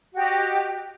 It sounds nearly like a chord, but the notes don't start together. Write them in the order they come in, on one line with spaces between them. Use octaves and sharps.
F#4 G4 D#5